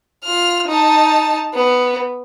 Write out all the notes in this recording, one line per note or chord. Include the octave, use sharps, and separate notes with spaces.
F4 F6
D#4 A5
B3